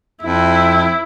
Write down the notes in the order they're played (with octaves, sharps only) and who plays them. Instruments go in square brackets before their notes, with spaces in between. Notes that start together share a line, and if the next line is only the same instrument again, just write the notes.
[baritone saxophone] F2 [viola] E4